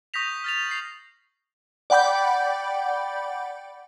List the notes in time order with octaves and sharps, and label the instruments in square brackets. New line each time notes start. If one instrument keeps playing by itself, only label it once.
[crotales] C#6 D#6 G6 A#6 B6 F7
F6 A6 F7
C7 F#7
[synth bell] D5 F#5 G5 B5 D6 G6